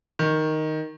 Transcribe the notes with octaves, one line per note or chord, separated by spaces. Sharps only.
D#3